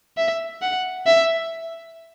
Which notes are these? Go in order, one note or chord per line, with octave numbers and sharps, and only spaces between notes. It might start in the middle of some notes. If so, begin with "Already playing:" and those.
E5
F#5
E5